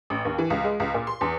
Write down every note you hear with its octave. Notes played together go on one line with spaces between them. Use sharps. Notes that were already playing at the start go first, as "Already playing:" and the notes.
A1
D#2
E3
C#2
G#3
C#2
A#2
C6
E2